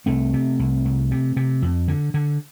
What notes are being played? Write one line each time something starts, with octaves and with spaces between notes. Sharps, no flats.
C2 A3 C4
C3
C2
C2
C3
C3
F2
D3
D3